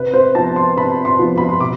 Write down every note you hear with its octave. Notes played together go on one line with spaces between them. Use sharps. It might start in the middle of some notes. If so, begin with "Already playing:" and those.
Already playing: C3 B4
C5
F3 B3 A5
C6
C3 B5
C6
F3 B3
B5
C6
B2 D6